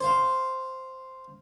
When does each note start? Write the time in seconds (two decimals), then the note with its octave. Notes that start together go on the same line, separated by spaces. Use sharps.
0.01 C5 F5